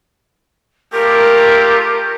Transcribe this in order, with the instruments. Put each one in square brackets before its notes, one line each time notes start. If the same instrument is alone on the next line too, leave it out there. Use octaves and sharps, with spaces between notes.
[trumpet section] A3 F4 G4 [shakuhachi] A#4